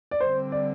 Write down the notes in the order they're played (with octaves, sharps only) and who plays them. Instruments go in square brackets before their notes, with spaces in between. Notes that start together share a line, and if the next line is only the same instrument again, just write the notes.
[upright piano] D5
[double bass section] D3 G3 C4 [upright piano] C5
[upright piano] D5